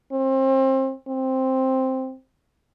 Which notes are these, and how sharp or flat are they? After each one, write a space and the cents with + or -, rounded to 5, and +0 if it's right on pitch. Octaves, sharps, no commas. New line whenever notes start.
C4 +30
C4 +5